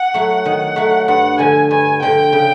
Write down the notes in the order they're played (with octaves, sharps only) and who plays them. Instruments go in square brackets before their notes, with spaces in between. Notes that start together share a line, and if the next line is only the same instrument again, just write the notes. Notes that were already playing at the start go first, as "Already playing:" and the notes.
Already playing: [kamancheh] F#5
[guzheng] F#3 A3
D#3
F#3 A3
[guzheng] G2 [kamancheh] F#5
[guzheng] D3 F3 [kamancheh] G#5
[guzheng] G2 [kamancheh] G#5
[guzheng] D3 F3 [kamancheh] G5
[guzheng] C#3